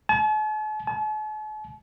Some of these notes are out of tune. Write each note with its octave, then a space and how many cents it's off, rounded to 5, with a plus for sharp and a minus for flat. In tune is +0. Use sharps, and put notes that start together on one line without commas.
A5 -45
A5 -45